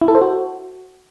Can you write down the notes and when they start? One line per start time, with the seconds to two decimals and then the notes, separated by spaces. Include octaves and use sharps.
0.01 E4
0.08 A4
0.15 C5
0.22 F#4